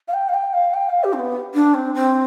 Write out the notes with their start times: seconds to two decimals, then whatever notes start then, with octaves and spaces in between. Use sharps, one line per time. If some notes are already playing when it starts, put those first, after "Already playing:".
0.08 F5
0.14 G5
0.29 F5
0.34 G5
0.53 F5
0.74 G5
0.89 F5
1.04 G4
1.13 C4
1.19 B3
1.54 D4
1.74 C4
1.94 C4